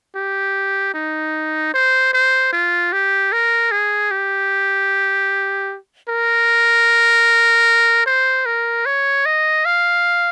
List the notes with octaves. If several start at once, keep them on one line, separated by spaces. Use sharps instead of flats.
G4
D#4
C5
C5
F4
G4
A#4
G#4
G4
A#4
C5
A#4
C#5
D#5
F5